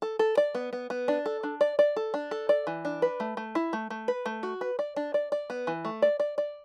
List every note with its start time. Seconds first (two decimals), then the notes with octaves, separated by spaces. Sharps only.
0.02 A4
0.19 A4
0.37 D5
0.55 B3
0.73 B3
0.90 B3
1.08 D4
1.26 A4
1.43 D4
1.61 D5
1.79 D5
1.96 A4
2.14 D4
2.31 A4
2.49 D5
2.67 E3
2.85 D4
3.02 B4
3.20 A3
3.37 A3
3.55 E4
3.73 A3
3.90 A3
4.08 B4
4.26 A3
4.43 F#4
4.61 B4
4.79 D5
4.96 D4
5.14 D5
5.32 D5
5.50 B3
5.67 E3
5.85 A3
6.02 D5
6.20 D5
6.38 D5